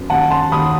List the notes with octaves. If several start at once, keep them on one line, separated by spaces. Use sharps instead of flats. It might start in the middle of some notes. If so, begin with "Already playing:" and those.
Already playing: F#2 B3
D#2 F#5 A5
A5 C6
D#2 B5 D#6